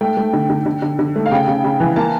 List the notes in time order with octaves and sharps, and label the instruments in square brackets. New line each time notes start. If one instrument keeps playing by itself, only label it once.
[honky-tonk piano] A3 G5
A3
D3
D3
D3
D3
D3
A3
F5
C#3 G5
C#3
C#3
E3
A#3 A5